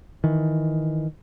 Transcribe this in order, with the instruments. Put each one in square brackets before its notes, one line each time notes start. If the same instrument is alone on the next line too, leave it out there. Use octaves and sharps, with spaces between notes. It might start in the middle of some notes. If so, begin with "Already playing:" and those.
[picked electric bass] D#3 E3